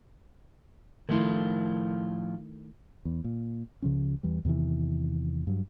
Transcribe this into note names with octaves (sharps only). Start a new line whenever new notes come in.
A2 D#3 F3 A3 E4 F4
E2
A#2
C#2 C#3 F3 C#4
E2 E3 G3
E2 C3 D#3 E3
G2 F#3